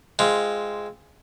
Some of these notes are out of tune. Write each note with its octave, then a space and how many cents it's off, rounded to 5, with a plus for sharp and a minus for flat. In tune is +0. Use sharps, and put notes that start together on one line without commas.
G#3 +0 C4 +0 F4 -10